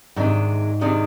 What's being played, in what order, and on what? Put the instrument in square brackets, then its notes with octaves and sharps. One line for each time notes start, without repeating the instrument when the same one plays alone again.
[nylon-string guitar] G#2 [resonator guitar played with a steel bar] C3 D#3 G#3 D4
[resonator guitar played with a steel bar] C3 D#3 G#3 D4